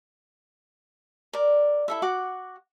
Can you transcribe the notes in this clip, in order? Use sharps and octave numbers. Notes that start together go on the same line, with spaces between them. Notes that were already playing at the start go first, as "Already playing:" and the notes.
A#4 D5
E4 A4 E5
F#4 F#5 D6